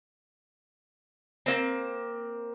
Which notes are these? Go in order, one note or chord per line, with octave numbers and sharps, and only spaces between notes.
A#3 C4